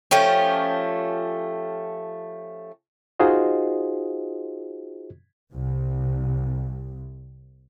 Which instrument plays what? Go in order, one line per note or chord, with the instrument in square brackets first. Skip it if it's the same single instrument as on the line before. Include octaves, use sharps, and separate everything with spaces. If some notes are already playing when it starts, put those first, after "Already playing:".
[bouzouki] F3 A3 C#4 G4
[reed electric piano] D#4 F4 F#4 G#4 C5 D#5
[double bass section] C2 C3